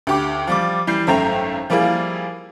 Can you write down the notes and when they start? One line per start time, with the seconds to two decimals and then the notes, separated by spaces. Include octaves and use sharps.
0.07 D2 G4 D6
0.47 F3 G3 D6
0.87 E3 G3 G6 C7
1.07 G#1 F#2 A3 G5 A#5 F7
1.70 F3 G3 A#3 E4 G#4